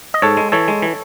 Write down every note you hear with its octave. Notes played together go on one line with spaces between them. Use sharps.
D#5
G#2 A4 C#5
G#3
E3 A4 C#5
G#3
E3